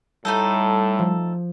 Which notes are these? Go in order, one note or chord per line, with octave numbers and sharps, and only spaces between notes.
A2 G3 A3 D#4 A4 G6
F3